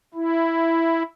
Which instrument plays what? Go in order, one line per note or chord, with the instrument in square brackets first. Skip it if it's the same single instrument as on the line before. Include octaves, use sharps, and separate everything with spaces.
[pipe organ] E4